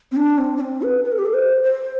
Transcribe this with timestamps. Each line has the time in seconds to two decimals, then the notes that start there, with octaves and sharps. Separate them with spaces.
0.12 C4
0.17 D4
0.38 C4
0.56 D4
0.61 C4
0.82 B4
1.04 B4
1.12 A4
1.18 G4
1.26 A4
1.34 C5
1.63 C5